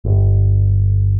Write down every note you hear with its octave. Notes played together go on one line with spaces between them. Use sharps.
G1